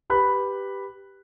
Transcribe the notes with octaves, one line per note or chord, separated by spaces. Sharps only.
G4 B4 B5 F#6